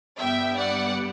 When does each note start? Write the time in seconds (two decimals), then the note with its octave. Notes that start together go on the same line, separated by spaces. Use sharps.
0.19 G2 D3 G3 B3 E5 G5
0.57 D5 F#5